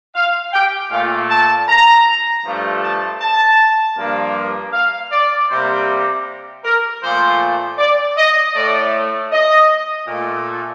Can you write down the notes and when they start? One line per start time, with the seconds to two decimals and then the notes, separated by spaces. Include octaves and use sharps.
0.15 F5
0.53 G5
0.91 A#2 A3 F5
1.30 A5
1.68 A#5
2.45 G2 F3 A3
2.82 A5
3.21 A5
3.97 G2 F3 A#3
4.73 F5
5.12 D5
5.50 C3 G3 A#3 C5
6.64 A#4
7.02 A#2 F3 A3 C5
7.78 D5
8.17 D#5
8.55 A2 A3 D5
9.32 D#5
10.08 A#2 A3